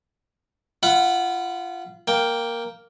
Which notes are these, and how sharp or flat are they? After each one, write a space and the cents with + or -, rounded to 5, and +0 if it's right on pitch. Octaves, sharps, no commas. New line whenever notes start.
F4 -25 F#5 +0 B5 +0
A#3 +0 G5 +0